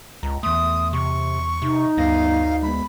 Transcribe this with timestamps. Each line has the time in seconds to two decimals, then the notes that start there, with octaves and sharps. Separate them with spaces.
0.23 C#2 A#5
0.43 E2 A3 C6 D#6
0.93 C3 C#6
1.62 C3 D#4
1.98 D2 G2 B3 F5 A#6
2.62 G#3 B3 B5